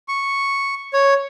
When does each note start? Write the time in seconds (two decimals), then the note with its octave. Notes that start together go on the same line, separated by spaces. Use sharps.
0.08 C#6
0.93 C#5